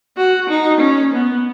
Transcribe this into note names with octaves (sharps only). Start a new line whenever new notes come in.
F#4
D#4
C#4
B3